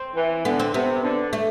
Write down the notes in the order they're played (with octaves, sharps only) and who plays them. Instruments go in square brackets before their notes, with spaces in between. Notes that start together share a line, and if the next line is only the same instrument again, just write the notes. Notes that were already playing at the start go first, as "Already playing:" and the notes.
Already playing: [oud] C4
[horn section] E3
[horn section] D3 [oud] B3
[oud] C4
[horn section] C3 [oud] B3
[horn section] D3
[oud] A3